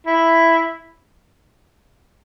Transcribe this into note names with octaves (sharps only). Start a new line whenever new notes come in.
E4